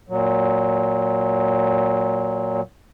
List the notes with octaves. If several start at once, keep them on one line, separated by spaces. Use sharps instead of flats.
A#2 F#3